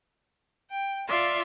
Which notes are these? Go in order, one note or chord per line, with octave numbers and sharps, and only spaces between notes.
G5
F4 D5 E5 F5 C6